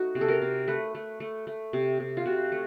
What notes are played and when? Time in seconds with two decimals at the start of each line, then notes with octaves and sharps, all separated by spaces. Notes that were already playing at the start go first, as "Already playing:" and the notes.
Already playing: A3 D#4 F#4
0.15 C3
0.21 A4
0.28 A#4
0.42 C3
0.68 A3 B4
0.95 A3
1.20 A3
1.47 A3
1.73 C3
2.00 C3
2.17 F4
2.26 C3 F#4
2.52 A3